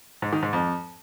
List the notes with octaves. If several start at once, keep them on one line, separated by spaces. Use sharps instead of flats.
G#2
D#3
G#2
F2